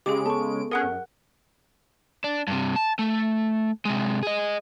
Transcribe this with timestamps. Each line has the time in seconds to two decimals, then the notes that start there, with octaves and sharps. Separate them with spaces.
0.06 C#3 G#3 G4 G#4 D6 D7
0.26 B3 A4 A5 C#6
0.71 C#4 G#4 A#4 F#5 F#6
0.83 F#2
2.24 D4
2.48 G2 C3
2.76 A5
2.99 A3
3.85 C3 G#3
4.23 G#4 D#5